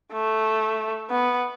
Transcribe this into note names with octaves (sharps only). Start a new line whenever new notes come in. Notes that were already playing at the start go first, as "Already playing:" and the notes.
A3
B3